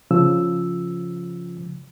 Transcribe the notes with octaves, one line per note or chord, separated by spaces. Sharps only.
C#3 F3 E6